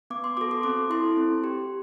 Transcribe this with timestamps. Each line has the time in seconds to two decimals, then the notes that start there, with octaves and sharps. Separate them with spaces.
0.10 B3 D6
0.24 C6
0.37 F#4 A4 D6
0.51 C6
0.63 C4 D6
0.90 E4 A4 C6
1.17 C4
1.44 G4